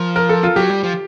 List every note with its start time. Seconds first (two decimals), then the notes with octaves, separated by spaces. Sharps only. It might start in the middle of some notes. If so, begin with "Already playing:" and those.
Already playing: F3 A#4
0.16 A#4
0.29 A4
0.43 F4
0.56 F#3 G4
0.70 G3
0.83 F3